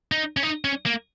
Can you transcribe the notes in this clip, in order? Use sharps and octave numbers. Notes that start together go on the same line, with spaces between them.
D#4
C#4
D#4
C#4
A#3